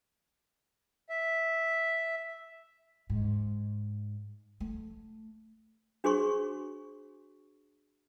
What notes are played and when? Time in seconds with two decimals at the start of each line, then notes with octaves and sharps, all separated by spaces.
1.09 E5
3.10 G#2
4.60 A3
6.04 D4 F#4 G#4 C5 C6 C#6